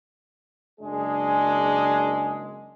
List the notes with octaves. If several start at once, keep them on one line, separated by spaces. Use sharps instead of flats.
F#1 G#3 D4 G#4